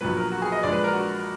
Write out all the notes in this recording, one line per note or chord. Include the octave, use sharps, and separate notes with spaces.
A#1 A#2 F#3 B3 B4
A#4
F#4
G#4
D#5
A#1 A#2 G#3 D4 D5
B4
A#4
F#4